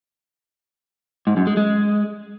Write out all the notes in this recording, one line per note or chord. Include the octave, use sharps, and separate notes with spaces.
G#2
F#2
G#3
G#3